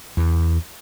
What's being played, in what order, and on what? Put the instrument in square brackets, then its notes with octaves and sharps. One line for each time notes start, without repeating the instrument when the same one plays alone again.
[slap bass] E2